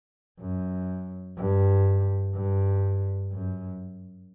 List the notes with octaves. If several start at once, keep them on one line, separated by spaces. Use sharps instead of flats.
F#2
G2
G2
F#2